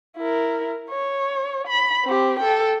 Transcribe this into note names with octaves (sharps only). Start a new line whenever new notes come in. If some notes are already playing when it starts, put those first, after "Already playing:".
E4 A#4
C#5
B5
C4 G4
A4 G5